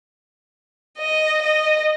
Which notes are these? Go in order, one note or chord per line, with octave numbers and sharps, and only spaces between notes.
D#5
D#5